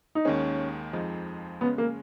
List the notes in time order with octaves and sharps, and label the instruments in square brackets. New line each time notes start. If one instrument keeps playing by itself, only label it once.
[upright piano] D#4
[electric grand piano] D#2 D#3 G#3 [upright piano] C#4
[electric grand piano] F2 F3 G#3 D#4
[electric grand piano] C#3 G#3 C#4 [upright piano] B3
[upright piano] A#3